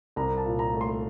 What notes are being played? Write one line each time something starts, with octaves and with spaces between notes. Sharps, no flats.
C2 A#5
A5
A#2
A#5
A3
C6